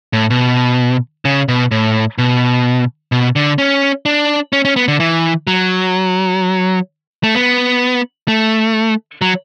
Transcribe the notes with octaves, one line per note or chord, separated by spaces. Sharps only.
A2
B2
C#3
B2
A2
B2
B2
D3
C#4
D4
C#4
C#4
B3
D3
E3
F#3
A3
B3
A3
F#3